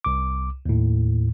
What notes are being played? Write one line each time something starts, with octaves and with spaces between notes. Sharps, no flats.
C2 D6
D#2 A2